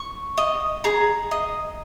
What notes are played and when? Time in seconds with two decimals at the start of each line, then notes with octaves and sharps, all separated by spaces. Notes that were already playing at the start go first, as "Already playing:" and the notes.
Already playing: C#6
0.38 D#5
0.84 G#4 A#5
1.31 D#5